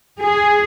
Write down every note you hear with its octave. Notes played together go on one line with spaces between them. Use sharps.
G#4